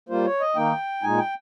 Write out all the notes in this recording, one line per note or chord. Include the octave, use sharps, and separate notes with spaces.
G3 A#3 F4 C5
C#5
D#5
D#3 A#3 D#4 G5
A#2 G#3 D#4 G#5
G5